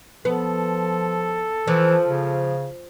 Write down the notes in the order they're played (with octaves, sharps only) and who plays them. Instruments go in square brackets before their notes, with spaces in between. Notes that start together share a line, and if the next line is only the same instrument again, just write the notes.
[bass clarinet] F3 [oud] B3 [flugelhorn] A4
[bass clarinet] E3 [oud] F3
[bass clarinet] C#3